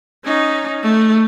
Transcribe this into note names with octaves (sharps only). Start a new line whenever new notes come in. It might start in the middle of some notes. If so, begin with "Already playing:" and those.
C#4 D#4
A3